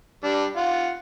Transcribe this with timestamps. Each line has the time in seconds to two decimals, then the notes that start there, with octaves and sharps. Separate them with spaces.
0.24 G3 D4
0.56 F4 F#5